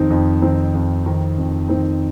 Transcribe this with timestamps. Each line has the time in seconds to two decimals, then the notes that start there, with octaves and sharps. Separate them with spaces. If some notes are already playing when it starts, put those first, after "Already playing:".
Already playing: F2 D#3 C4 D#4
0.10 F2
0.42 D#3 C4 D#4
0.75 F2
1.06 D#3 C4 D#4
1.38 F2
1.69 D#3 C4 D#4